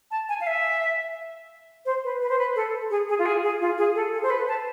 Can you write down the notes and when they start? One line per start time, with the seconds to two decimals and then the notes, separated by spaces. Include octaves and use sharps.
0.11 A5
0.29 G#5
0.41 F5
0.47 E5
1.86 C5
2.04 B4
2.21 B4
2.29 C5
2.39 B4
2.56 A4
2.90 G#4
3.09 G#4
3.19 F4
3.26 G#4
3.43 G#4
3.61 F4
3.78 G#4
3.95 A4
4.13 A4
4.23 C5
4.30 B4
4.48 A5